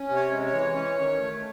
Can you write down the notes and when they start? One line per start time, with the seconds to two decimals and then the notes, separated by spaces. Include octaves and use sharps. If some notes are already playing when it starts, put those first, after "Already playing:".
Already playing: C#4
0.08 C3
0.16 C#5
0.31 G#3
0.46 C#5
0.54 E3
0.75 C#4
0.98 D#3
1.20 A3